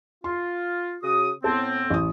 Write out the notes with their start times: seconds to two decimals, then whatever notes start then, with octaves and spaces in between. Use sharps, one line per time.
0.24 F4 C6
1.02 C#3 F#4 D#6
1.44 A2 B3 C4 A4
1.90 A1 D#6